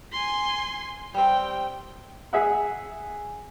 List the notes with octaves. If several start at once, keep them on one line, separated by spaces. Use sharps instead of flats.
G#5 C6
G3 C4 G5
G#4 E5 F#5